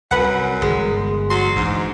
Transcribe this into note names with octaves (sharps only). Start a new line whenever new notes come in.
C2 F#2 B4 F#5
G1 E3 G#3
F#3 C6
A1 G#2 E3 D4